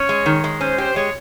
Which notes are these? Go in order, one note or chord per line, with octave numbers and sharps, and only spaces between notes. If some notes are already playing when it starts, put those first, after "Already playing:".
Already playing: C#4 C#5
G#3
D#3
G#3
C#4 C5
G4 C5
G#3 C#5